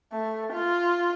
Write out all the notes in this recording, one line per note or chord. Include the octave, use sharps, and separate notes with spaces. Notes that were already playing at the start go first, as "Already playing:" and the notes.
A3
F4